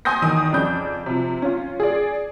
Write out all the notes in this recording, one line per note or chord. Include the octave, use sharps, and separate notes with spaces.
G#5 C6 D#6 G6 A#6
E2 D#3 D#6
F2 C#3 D5 G6
C3 F3
C#4 F4
G#4 D5